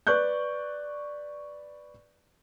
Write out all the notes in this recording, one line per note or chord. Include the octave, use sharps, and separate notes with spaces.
B4 D5 C#6 F#6 G6